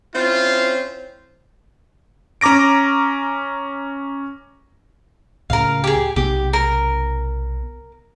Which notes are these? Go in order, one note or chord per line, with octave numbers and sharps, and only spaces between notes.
C4 C#4 E4 F4
C#4 A#5 D6 A#6 D7
C#2 A2 C#3 A#4 F5
G4 G#4
B1 C3 B3 G4
A#4